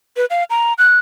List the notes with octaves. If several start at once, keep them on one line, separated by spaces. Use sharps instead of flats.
B4
F5
A#5
F#6